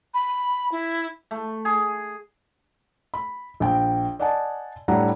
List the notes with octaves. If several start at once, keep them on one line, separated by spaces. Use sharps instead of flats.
B5
E4
A3
G#4
B5
A#1 G5
D5 D#5 F#5 G#5 A5
A2 G3 D4 E4 F#5 A#5